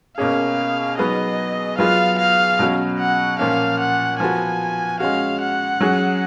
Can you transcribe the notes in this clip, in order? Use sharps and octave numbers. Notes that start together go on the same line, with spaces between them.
B2 A#3 C#4 G#4 F5
F#3 B3 D#4 G#4 D#5
F#3 B3 F4 G#4 F5
F5
B2 F#3 C#4 F#4
F#5
A#2 F3 A#3 C#4 F5
F#5
F3 B3 F#4 G#5
G#3 C#4 F#4 F5
F#5
F#3 C#4 G#4